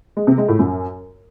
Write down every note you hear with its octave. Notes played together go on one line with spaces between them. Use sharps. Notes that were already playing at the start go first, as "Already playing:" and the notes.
G#3
C3
G#3
A2
F#2